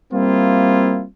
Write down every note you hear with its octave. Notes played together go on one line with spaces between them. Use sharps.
G3 A#3 C4 E4 F4